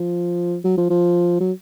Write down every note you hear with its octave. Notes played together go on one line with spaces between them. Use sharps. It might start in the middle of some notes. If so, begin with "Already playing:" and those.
Already playing: F3
F#3
F3
F3
F#3